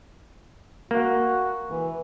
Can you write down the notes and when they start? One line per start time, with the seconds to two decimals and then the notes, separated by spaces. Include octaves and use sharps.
0.91 A#3 F#4
1.67 E3